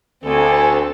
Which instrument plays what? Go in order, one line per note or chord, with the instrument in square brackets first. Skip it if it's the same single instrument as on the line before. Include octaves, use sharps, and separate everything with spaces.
[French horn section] D2 [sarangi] C4 [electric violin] A4 [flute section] G#5